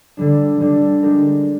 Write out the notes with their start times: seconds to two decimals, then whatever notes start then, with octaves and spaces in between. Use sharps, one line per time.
0.17 D3 G3 D4
0.60 D3 G3 D4
1.03 G#3 D4 G4 A#4